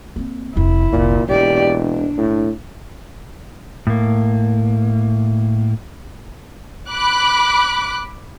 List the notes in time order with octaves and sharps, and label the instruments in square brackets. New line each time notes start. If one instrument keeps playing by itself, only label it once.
[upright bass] A#3 C4
[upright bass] F1 D#2 [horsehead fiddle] E4
[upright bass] F1 C2 [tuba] A#2
[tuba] E1 [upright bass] B1 A#3 [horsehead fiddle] G4 D5
[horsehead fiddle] D4
[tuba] A2
[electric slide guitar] A2 A#3
[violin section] B5 D6 F#6